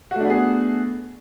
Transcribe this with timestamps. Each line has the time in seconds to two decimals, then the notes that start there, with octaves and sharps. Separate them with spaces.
0.11 F#4
0.16 A3
0.20 D4
0.25 B3
0.30 G#4